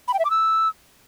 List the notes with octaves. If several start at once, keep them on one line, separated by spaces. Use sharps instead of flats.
B5
G5
E5
D6
E6